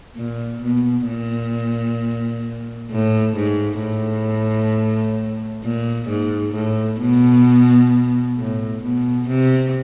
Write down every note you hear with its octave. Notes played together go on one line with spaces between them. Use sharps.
A#2
B2
A#2
A2
G#2
A2
A#2
G#2
A2
B2
A2
B2
C3